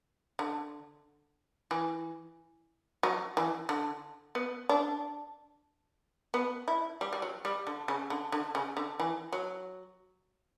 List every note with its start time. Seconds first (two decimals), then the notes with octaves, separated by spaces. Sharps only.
0.39 D3
1.71 E3
3.03 F#3
3.37 E3
3.69 D3
4.35 B3
4.69 D4
6.34 B3
6.68 E4
7.01 G3
7.13 G3
7.22 F#3
7.45 G3
7.67 D3
7.88 C#3
8.10 D3
8.32 D3
8.55 C#3
8.77 D3
9.00 E3
9.33 F#3